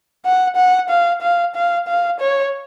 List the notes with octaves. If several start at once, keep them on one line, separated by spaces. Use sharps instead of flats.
F#5
F#5
F5
F5
F5
F5
C#5